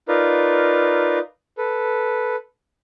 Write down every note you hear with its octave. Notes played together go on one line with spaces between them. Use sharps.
D#4 F4 A#4 B4 D5
A4 B4